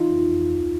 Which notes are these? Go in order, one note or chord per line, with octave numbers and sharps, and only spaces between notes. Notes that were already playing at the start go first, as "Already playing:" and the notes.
Already playing: E3 D#4 F4
F2
F2
D2